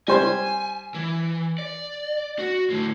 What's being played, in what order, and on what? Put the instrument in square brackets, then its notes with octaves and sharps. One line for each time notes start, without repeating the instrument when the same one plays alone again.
[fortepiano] G3 C5 C6 [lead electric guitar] G#5
[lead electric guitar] E3
D5
F#4
A2 D3